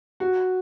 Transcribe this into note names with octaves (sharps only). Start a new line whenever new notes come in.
F#4